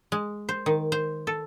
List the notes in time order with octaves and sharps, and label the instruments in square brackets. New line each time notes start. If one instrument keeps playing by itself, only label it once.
[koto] G#3
C5
D#3
C5
A4